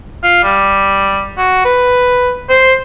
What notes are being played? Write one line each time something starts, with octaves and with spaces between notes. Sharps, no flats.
F4
G3
F#4
B4
C5